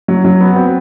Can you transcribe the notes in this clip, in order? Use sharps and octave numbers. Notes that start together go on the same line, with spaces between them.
F#3
F#3
B3
C4